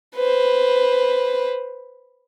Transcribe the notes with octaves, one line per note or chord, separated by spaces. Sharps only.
B4 C5